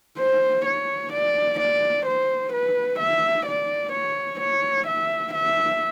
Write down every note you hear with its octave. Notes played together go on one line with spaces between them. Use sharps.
C5
C#5
D5
D5
C5
B4
E5
D5
C#5
C#5
E5
E5